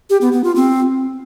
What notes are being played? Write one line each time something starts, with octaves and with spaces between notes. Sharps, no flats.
G4
B3
B3
F4
C4